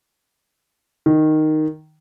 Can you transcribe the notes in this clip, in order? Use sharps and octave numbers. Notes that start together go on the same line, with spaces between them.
D#3